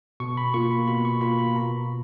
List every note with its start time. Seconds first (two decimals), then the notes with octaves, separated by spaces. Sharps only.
0.20 B2 C#6
0.37 B5
0.54 A#3 F4 C#6
0.71 B5
0.88 B2 B5
1.05 C#6
1.21 A#3 F4 B5
1.39 B5
1.55 B2 A#5